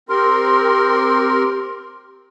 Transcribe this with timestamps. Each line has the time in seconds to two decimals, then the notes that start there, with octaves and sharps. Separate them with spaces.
0.09 C4 G4 A#4 C6